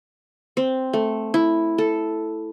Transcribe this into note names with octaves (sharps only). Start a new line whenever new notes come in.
C4
A3
E4
A4